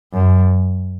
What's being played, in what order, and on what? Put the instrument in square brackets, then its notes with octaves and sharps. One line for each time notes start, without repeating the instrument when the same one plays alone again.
[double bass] F#2